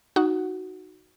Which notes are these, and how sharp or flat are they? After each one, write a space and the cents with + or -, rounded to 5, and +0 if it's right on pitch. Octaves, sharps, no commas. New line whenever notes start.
D#4 +0 F#4 +0 F#5 +0